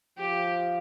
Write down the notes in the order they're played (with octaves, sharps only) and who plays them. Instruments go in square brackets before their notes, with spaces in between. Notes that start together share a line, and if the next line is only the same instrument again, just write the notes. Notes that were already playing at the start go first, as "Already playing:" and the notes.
[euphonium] F3 [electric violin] G4